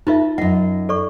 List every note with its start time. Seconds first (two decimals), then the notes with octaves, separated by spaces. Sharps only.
0.07 D#4 F4 A4 B4 E5
0.38 F#2 D#5 F#5
0.89 A4 D5 C#6